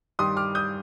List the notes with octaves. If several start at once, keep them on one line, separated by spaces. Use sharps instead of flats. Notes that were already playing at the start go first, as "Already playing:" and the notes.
G2 D#3 G3 C6 D#6
D6 F6
D#6 G6